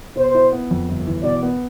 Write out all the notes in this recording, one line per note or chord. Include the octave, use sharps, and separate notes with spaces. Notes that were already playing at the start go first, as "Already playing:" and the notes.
B2 C5
E4
B3
F2
G1
E3
B2 D5
B3